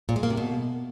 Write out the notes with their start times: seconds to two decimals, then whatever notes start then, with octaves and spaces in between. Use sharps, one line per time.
0.09 A#2
0.16 G#3
0.23 A#3
0.30 C3
0.37 B2